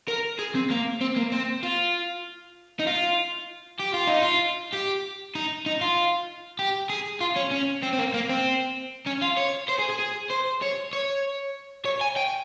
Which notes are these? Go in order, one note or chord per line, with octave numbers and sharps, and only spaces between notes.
A#4
G#4
C4
A#3
C4
A#3
C4
F4
D#4
F4
G4
F4
D#4
F4
G4
D#4
D#4
F4
G4
G#4
F4
C#4
C#4
C4
C4
A#3
A#3
C4
C#4
F4
C#5
C5
G#4
G#4
G#4
C5
C#5
C#5
C#5
G#5
G5